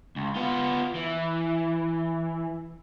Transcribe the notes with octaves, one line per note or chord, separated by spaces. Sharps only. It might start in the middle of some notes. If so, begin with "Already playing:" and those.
C#2
B3 F4
E3